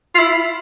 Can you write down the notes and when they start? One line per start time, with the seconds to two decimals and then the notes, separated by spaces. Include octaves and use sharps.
0.15 F4
0.19 E4